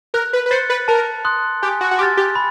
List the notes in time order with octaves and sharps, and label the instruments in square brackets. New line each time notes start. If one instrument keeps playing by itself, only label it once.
[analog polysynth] A#4 [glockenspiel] F#6
[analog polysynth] B4
B4
[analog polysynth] C5 [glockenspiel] A6 C#7
[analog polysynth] B4
[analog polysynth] A#4 [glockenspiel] A5
[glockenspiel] C6 D#6 F#6
[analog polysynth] G4 [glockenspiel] G#5
[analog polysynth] F#4
F#4
[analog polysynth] G4 [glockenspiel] C6
[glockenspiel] F6 A6
[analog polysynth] G4
[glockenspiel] B5